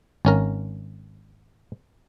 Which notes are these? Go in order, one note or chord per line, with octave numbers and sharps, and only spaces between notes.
G#1 C#4 A#4